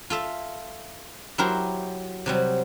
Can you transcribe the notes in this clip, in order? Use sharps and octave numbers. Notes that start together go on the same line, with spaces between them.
F4 A4 E5
F#3 E4 G4 A#4 C5
C3 F#3 G3